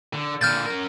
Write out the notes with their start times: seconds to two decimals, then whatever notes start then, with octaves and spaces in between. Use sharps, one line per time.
0.13 D3
0.41 A#2 D3 F6 G6 A6
0.66 C#4 A#4